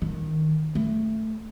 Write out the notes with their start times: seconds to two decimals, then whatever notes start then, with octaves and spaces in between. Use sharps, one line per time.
0.02 D#3
0.75 A3